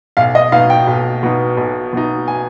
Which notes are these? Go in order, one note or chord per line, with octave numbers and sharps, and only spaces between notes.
B1 F5
D#5
B2 B3 D#4 F5
G5
B1
B2 B3 D#4
B1
B2 B3 D#4
G#5